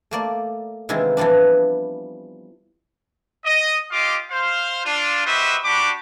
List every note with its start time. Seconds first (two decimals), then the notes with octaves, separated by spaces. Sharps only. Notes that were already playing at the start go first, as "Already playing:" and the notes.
0.11 A3 A#3 D5
0.89 C3 D#3 E3 G#3 E4 F4
1.17 E3 F3 G3 B3 D4
3.45 D#5
3.91 F4 G4 D#5 F5 D6
4.31 C5 F5
4.85 D4 F4
5.25 F#4 G4 B4 C5 D#5 E5
5.64 G3 D4 F#4 G4 B5 D6